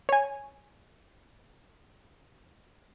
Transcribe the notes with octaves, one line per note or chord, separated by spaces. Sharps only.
C#5 G#5